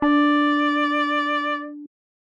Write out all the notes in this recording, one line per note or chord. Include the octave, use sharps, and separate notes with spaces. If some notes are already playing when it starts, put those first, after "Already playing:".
D4 D5